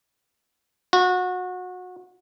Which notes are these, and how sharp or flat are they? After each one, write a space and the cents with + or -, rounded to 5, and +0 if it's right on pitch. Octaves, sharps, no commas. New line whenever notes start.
F#4 -25